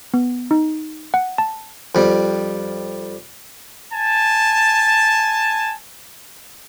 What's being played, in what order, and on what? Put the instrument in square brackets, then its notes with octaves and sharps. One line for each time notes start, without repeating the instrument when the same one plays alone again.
[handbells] B3
D#4
F#5
A5
[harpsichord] F2 G3
[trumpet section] G#5 A5